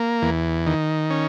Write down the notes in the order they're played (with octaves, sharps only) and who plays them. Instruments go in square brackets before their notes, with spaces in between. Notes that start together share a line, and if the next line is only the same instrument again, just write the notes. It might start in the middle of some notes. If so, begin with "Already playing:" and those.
Already playing: [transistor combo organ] A#3
E2
D#3
C#4